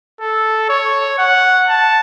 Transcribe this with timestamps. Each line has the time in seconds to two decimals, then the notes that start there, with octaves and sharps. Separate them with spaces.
0.21 A4
0.69 C#5
1.19 F#5
1.68 A5